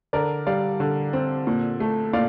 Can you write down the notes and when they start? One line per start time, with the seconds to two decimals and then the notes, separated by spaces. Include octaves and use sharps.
0.13 D3 A#4 D5
0.47 G3 D5 F5
0.80 D3
1.13 C4
1.47 A#2
1.80 A3
2.13 A#2 D5 F5